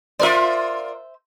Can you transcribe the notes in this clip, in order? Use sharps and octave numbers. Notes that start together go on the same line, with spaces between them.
F4 A#4 C5 D5 E5